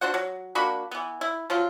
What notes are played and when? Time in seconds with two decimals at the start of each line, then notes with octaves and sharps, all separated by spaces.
0.01 D4 F#4 C5 F#5
0.14 F#3
0.55 A#3 D4 F#4 B5
0.91 E3 B3
1.21 E4
1.50 F3 F#3 F4